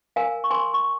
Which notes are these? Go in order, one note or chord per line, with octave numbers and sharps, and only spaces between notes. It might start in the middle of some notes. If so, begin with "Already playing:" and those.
A#4 F5 G#5
C#6
A#4 G#5 C6
C#6